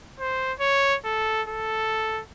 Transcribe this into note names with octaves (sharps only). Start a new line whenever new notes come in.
C5
C#5
A4
A4